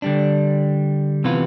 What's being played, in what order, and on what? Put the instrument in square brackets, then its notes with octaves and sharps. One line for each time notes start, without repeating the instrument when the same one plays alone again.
[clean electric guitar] D3 G3 D4
C3 E3 B3 F4